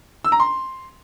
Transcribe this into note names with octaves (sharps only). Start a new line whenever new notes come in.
E6
A#5
C6